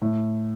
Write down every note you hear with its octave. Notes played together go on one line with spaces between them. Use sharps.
A2